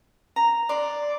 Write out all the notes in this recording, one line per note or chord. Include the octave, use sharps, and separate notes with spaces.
A#5
D5 C6